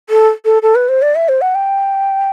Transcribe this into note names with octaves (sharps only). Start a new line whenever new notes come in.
A4
A4
A4
B4
C5
D5
E5
C5
F#5
G5